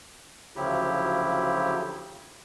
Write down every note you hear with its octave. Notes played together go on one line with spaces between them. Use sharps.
D2 C#3 F3 F#3 E4 G4